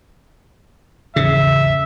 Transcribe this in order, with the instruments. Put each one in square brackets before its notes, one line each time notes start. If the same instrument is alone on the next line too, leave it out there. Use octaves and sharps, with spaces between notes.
[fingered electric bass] D#1 G#1 E2 [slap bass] C#3 [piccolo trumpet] E5